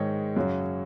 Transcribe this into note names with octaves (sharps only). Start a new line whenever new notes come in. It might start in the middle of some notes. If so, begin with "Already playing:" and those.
Already playing: G#2 D#3 G#3 C#5 D#5
F#2 C#3 F#3